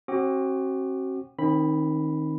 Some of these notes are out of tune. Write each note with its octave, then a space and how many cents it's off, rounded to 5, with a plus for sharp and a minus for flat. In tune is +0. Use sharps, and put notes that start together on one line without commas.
C4 +40 F#4 +25 D6 +40
D#3 +0 C4 +35 B5 +0